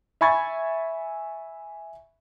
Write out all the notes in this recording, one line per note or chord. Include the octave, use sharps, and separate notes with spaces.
E5 G#5 B5 C#6 G#6 A6